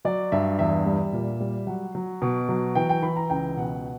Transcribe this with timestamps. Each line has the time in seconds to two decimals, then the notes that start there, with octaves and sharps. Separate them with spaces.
0.05 F#3 D5
0.32 G2 E5
0.59 E2 E5
0.86 G3
1.13 A#2
1.40 G3
1.67 F#3 F#5
1.95 F#3
2.22 B2
2.49 F#3
2.75 E3 G5
2.89 G5
3.02 E3 B5
3.16 A#5
3.30 C#2 G5
3.57 B2 F#5